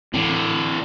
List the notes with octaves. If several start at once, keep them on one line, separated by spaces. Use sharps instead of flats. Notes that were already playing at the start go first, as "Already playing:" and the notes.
A2 D3 E3 C4